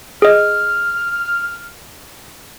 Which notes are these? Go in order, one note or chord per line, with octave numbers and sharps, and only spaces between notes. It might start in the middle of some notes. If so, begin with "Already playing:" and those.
G#4 D#5 F6